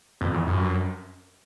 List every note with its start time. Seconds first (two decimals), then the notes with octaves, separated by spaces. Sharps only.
0.21 F2
0.34 E2
0.47 F#2